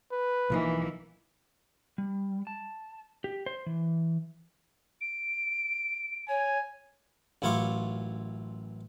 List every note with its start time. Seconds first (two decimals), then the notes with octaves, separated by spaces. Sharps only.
0.12 B4
0.50 B1 E3 F3 A#3 D#4
1.98 G3
2.47 A5
3.24 G4
3.46 C5
3.66 E3
5.01 D7
6.29 C#5 G#5
7.42 A1 F#2 E4 F4 C#6 D6